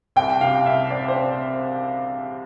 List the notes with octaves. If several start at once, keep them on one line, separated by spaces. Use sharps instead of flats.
C2 G5
C3 F5
C2 E5
C4 D5
C5
C4